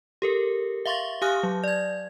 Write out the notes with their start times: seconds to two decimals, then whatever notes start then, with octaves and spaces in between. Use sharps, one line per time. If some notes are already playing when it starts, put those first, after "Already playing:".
0.22 G4 A4 A#4
0.86 E5 F5 C6 C#6 A6
1.22 G4 F5 G#5 D#6 F6 F#6
1.43 F#3
1.64 D5 G#6